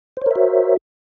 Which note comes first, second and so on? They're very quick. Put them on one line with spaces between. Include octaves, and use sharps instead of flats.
C5 C#5 A#4 E5 F#4